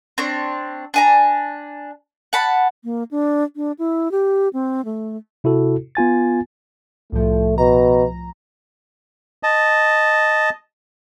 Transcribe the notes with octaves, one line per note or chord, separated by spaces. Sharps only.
C4 D4 C#5
D4 G#5 A#5
F#5 A5 B5
A#3
D4
D4
E4
G4
C4
A3
C3 E4 F#4 A4
B3 F4 G#5 A6
C2 A2 F3 A3
B2 A#5
D#5 A5